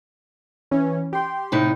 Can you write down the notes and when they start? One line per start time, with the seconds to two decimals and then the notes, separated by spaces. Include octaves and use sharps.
0.71 E3 C#4
1.13 G4 C6
1.52 A2 C3 D#4